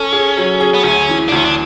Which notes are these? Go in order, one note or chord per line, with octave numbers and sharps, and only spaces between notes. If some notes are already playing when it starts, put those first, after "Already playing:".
Already playing: C#4 A4
G#4
F#3
G#4
B3
D2 C#4
E3
D4
D2 C#4
D4